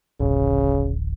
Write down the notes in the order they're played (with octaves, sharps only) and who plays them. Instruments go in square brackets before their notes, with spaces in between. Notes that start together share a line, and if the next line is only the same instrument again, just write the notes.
[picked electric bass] D1 A1 [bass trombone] C#3